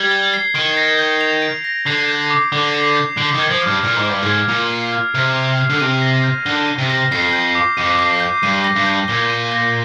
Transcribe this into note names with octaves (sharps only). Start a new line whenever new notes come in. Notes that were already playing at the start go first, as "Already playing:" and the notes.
Already playing: G3 G#6
G7
C7
D#3 D7
A#6
G6
F7
D7
A#6
D3 C7
G6
D6
D3 D6
C7
G6
D3 D7
D#3 G#6
F3
G2 F6
A#2 F6
G#2
G2 D7
G#2 G#6
A#2 F7
C7
F6
C3 F6
F7
C7
D3
C3 D#7
A#6
G6
D3 G7
D#7
C3
A#6
F2 C7
G6
D6
F2 D#7
C7
G6
G2 D#7
A#6
G2
G6
A#2 G7
D#7
A#6